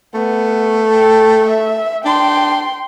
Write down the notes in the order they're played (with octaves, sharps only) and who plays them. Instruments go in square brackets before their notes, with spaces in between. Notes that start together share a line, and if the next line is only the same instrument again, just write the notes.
[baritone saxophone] A3 [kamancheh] B3
[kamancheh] A4 G5
E5
[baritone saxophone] D4 [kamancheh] G5 C6